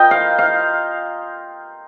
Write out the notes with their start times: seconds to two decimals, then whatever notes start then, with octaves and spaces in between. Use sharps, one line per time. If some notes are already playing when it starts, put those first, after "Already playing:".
Already playing: F4 A#4 D#5 G5
0.11 F5
0.39 F5